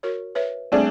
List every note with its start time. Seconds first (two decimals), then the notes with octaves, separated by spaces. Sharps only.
0.03 F#4 A#4 C#5
0.35 B4 C#5 E5
0.72 G3 A3 C4 D4 G#4